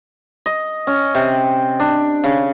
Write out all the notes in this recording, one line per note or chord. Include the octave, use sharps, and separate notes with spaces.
D#5
C#4
C3
D4
C#3